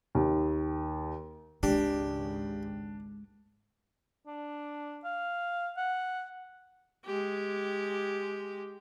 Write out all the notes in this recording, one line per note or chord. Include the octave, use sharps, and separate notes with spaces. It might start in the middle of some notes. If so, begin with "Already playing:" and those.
D#2
G#1 C#2 C#3 G#3 D4 G4
D4
F5
F#5
G#3 G4